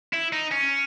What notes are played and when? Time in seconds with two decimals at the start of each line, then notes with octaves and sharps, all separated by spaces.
0.13 E4
0.33 D#4
0.52 C#4